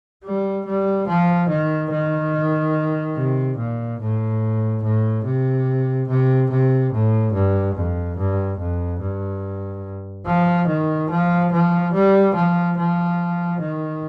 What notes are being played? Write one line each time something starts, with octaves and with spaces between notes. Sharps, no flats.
G3
G3
F3
D#3
D#3
C3
A#2
A2
A2
C3
C3
C3
A2
G2
F2
G2
F2
G2
F3
D#3
F3
F3
G3
F3
F3
D#3